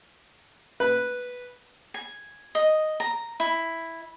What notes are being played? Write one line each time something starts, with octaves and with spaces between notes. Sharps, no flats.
B4
G#5
D#5
A#5
E4